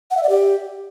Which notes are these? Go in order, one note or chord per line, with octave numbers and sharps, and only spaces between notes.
F#5
E5
D5
G4